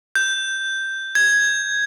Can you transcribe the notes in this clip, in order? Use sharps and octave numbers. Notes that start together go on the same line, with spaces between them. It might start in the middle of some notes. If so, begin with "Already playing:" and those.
G6
G#6